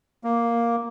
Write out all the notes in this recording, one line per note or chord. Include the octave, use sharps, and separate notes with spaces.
A#3